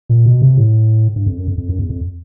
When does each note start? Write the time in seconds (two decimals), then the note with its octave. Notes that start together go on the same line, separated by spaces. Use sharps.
0.09 A#2
0.26 B2
0.42 C3
0.58 A2
1.16 G2
1.26 F2
1.38 F#2
1.48 F2
1.58 F2
1.69 F#2
1.79 E2
1.90 F2